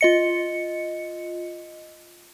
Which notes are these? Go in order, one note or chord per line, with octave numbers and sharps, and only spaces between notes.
F4 D#5 C#7